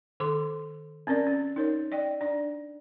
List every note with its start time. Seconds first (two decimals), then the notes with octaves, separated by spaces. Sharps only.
0.20 D#3 A4 C6 D6
1.07 C4 C#4 A#4 D5
1.27 C#4
1.56 D#4 A#4 C#5
1.92 D5 D#5 G5
2.21 D4 D5